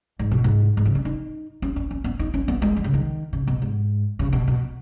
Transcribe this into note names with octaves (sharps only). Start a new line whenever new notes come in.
G#2
B2
G#2
G#2
C#3
C#4
D#4
C#4
C#4
C#4
B3
D#4
C#4
B3
G#3
D#3
C#3
D#3
C#3
B2
G#2
C#3
B2
B2